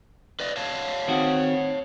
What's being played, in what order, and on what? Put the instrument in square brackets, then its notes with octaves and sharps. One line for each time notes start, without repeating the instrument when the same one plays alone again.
[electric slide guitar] B4 D5 D#5
C#5 F5 A5
[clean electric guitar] D#3 C4 F#4